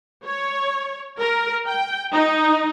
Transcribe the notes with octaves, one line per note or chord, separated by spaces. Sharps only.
C#5
A#4
G5
D#4